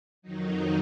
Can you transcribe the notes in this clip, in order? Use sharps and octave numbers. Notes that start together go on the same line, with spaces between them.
F2 D#3 F#3 D#4